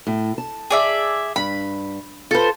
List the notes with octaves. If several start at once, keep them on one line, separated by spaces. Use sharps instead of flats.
A2
A5
G#4 D5 E5
G2 B5
F4 A4 B4 C5